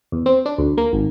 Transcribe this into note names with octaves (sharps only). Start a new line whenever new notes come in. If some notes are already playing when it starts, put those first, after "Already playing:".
E2
C4
D4
D2
A#3
G#1